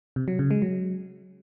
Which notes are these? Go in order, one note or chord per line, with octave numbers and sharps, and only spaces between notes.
C3
F#3
C#3
G#3
F#3